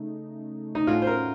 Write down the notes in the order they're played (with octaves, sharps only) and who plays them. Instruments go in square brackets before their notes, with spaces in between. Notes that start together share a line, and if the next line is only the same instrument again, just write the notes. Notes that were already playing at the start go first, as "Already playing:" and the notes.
Already playing: [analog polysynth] C#3 A3 D#4
[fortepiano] D#4
[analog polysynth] A2 A3 C#4 F#4 A4 [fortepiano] F4
[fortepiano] C5
A#4